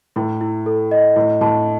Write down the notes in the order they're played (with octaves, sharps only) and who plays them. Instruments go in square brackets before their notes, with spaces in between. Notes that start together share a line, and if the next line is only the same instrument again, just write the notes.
[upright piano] A2 [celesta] E4
[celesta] E4
A4
D#5
[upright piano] A2 [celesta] E4
[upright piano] A2 [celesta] A5